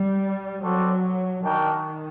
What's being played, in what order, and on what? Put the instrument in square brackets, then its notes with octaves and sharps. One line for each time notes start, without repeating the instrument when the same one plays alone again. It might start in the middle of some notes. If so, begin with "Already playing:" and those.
Already playing: [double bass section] G3
[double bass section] F#3 [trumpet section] C4 F#4 A4 D5
[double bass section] D#3 [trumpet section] D4 F#4 A#4 D#5 G5